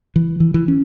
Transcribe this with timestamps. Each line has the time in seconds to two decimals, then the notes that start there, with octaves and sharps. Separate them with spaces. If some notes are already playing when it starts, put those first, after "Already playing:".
0.16 E3
0.40 E3
0.54 E3
0.68 C#4